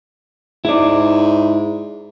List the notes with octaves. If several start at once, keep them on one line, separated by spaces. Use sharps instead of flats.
G#2 E4 D5